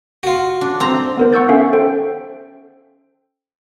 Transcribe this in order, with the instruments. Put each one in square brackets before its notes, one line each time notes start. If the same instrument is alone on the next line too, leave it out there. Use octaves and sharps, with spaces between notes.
[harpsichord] F4 F#4
[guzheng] D4
C4 A#5
[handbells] B3 A#4 C5
F#5 C#6 E6 G6 A6
C#4 A4 E5 F5
A4 C5 G5